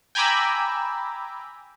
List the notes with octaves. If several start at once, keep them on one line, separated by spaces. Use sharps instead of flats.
G5 G#5 A#5 B5 D6 E6